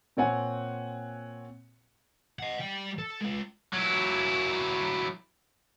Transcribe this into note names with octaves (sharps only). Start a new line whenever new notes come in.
A#2 C4 C#5 F#5 G#5
D#5 F#5
G3 G5
A4
G#3 F4
F#3 E4